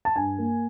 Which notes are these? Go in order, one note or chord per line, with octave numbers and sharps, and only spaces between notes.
A5
G2 G#5
A#3